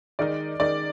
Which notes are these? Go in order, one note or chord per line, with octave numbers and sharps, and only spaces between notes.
D#3 G#3 D#4 A#4 D5 D#5
D#3 G#3 D#4 A#4 D5 D#5